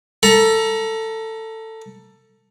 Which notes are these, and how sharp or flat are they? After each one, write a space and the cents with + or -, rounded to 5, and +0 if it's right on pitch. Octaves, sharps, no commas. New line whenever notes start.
A4 +15 A#5 +30